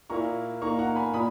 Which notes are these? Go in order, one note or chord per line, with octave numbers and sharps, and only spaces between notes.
A#2 A#3 E4 A#5 C#6
A#2 A#3 D#4 A#5 C#6
F#5 A#5
G#5 B5
A#2 B5 D#6